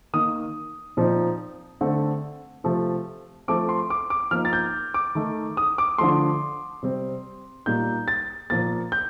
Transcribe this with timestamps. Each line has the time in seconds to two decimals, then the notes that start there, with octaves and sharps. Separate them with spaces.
0.13 D#3 A#3 D#4 D#6
0.97 A#2 F3 C4 D#4
1.81 D3 A3 C4
2.64 C3 F3 A3
3.48 F3 A3 C4 D6
3.69 C6
3.90 D6
4.10 D6
4.31 F3 A#3 D#4 F6
4.45 A6
4.53 G6
4.94 D6
5.15 D#3 A3 D#4
5.57 D#6
5.78 D6
5.98 D3 F3 A3 C6
6.83 C3 G3 C4
7.66 A#2 G3 A#3 D#4 G6
8.08 A6
8.50 A#2 F3 A#3 A6
8.92 G6